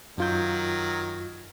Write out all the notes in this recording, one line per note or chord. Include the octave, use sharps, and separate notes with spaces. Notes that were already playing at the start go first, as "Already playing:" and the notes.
F#2 D#3 F#3 F4 G6